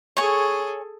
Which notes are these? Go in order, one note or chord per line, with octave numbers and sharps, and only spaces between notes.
G#4 A4 C#5 G#5 C#6